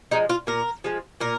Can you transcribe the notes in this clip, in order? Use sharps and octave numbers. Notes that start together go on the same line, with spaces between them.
F3 G#3 D#4
F4
A#2 A#4
F3 G#3
A#2 A#4